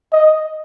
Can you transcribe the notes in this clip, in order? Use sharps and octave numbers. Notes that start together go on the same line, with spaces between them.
D#5